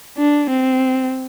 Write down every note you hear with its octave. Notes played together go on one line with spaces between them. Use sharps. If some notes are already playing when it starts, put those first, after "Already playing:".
D4
C4